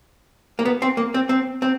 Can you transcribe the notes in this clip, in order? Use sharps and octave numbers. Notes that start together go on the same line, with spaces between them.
A#3
B3
C4
A#3
C4
C4
C4